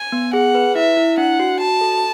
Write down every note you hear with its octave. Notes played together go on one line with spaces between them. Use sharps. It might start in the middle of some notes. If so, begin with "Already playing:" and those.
Already playing: G#5
B3
G#4 F#5
B4
E4 E5
E4
D4 F#5
F#4
F#4 A5
A4